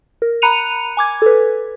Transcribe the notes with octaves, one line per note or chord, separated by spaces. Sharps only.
A#4
A#5 B5 F#6 C#7 D#7 F7
G#5 D6 G#6
A4 B4